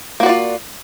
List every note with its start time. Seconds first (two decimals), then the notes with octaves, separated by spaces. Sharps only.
0.20 A#3
0.23 F#4
0.26 D5
0.29 F4